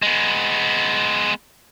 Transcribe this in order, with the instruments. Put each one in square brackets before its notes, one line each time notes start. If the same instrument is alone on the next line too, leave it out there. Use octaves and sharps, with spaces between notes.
[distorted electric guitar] G#3 B3